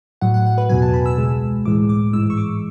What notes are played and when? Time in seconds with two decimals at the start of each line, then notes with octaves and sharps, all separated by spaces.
0.21 A2 F#3 F#5
0.34 F#5
0.47 F#5
0.58 B4
0.69 E2 B2 F#3 G#5
0.82 A5
0.94 B5
1.06 E6
1.18 C#2 B2 G#3
1.65 A2 E3 G#3 D6
1.89 D6
2.13 G#2 E3 G#3 E6
2.30 C#6
2.37 D6